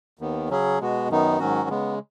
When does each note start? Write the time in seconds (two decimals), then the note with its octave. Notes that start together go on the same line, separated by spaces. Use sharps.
0.19 D#2 D#3 B3
0.49 C#3 F#3 C#4 G#4
0.80 B2 G#3 B3 F#4
1.09 F#2 D#3 B3 D#4
1.39 G#2 D#3 F#3 C#4 F#4
1.69 C#3 G#3 B3